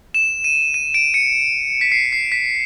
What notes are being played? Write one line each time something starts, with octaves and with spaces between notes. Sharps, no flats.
E7
D#7
D#7
D7
C#7
B6
C7
C7
B6